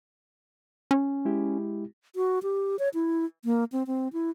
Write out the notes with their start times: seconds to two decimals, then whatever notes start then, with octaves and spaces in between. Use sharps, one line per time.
0.91 C#4
1.25 G#3 E4 G4
2.16 F#4
2.43 G4
2.79 C#5
2.94 E4
3.45 A#3
3.72 C4
3.87 C4
4.13 E4